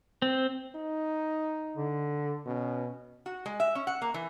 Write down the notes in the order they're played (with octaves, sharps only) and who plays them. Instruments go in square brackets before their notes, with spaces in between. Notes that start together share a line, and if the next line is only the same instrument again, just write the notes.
[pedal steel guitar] C4
[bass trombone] D#4
[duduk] D3
[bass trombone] B2 [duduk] C#4
[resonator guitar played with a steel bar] F#4
G#3
E5
C#4
F#5
A#3
E3